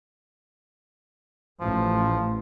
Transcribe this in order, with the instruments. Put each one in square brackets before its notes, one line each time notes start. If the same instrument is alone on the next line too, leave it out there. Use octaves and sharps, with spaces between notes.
[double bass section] A1 [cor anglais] F3